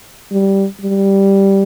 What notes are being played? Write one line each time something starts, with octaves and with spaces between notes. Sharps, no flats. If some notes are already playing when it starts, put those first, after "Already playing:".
G3
G3